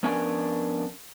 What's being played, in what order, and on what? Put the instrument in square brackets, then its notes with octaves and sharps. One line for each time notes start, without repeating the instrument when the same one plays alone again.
[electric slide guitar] F2 B3 C#4 D4 A#4 G#5